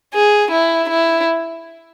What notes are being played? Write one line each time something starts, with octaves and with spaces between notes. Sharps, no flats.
G#4
E4
E4